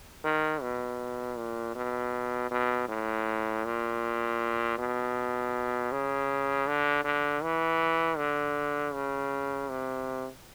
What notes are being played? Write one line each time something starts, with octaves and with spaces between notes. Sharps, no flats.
D#3
B2
A#2
B2
B2
A2
A#2
B2
C#3
D3
D3
E3
D3
C#3
C3